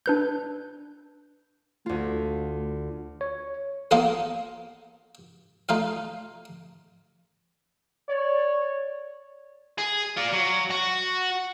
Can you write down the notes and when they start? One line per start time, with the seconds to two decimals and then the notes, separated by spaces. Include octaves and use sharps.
0.06 D4 B4 G6
1.86 D2 A3 F4
3.21 C#5
3.91 A#3 B3 D#4 F4 A4 A#4
5.69 A3 D#4 F4 F5
8.09 C#5 D5
9.78 G#4
10.17 F4 D5
10.34 F#3
10.70 F#4